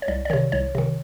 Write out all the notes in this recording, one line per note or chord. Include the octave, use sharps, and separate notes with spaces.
C#5
C2 D5
D5
C3 D#3 C#5
C2 C#5
C3 D#3